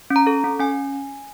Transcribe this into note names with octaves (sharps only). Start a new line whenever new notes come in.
C#4
A#5
A4
C#4
C#4 G#5